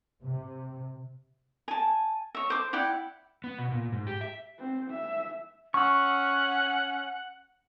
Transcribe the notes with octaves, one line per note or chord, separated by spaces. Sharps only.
C3
G#5 A5
C#5 E5
C5 D6
E4 D5 F#5 G5
B3
B2
A#2
G#2
G4
E5
C4
E5
C#4 F#5 C#6 E6